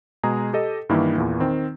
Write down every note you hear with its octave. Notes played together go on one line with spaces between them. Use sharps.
B2 G#3 G#4 A#5
G4 A4 D#5
G2 D#3 E3 A#3 E4
E2 A#2 E3
D#3 C4